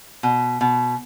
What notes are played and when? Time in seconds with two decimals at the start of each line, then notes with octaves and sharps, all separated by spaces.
0.23 B2
0.61 B2